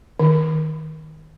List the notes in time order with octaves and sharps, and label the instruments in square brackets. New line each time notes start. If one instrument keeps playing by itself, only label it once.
[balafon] D#3